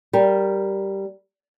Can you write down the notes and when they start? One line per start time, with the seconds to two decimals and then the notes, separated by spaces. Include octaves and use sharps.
0.13 G3 A#4